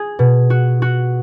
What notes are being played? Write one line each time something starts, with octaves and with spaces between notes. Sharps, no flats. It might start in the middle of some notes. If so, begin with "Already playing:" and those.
Already playing: G#4
B2
F#4
F#4